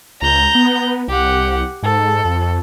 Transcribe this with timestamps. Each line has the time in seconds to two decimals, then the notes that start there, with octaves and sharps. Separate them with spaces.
0.22 C#2 A#5 G6
0.55 B3
1.08 C2 G4 F#5
1.83 G#2 A4
2.25 F2